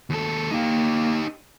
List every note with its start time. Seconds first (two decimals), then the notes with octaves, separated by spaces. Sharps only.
0.10 D#2 A4
0.51 A#3 D#4 G4